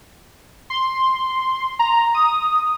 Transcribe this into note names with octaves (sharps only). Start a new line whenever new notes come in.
C6
A#5
D#6